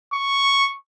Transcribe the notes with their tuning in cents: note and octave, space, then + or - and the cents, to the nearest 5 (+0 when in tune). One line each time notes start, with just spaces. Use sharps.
C#6 +0